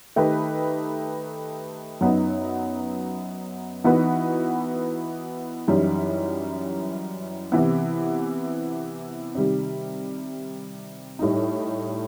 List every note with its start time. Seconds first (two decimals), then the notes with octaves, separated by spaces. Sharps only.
0.16 D#3 A3 D#4 G4 B4
2.01 F#2 F#3 B3 D#4
3.84 E3 B3 D#4 F#4 B4
5.68 F#2 E3 G3 D#4
7.52 C3 E3 B3
9.35 C3 D#3 G3
11.19 A2 G3 D#4